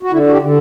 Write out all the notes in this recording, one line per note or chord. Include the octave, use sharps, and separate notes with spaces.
F#4
D3 E4
F#4
G4
D3